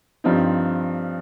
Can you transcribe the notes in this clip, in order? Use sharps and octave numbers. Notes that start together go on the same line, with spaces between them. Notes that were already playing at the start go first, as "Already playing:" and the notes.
G2 F3 C4 D#4